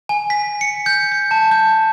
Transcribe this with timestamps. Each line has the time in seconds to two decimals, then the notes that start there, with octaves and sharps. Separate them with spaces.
0.09 G#5
0.30 B6
0.61 C#7
0.86 G6
1.12 G6
1.31 A5
1.51 G6